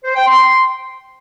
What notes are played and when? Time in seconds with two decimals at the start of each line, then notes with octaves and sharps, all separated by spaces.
0.04 C5
0.15 G5
0.26 C6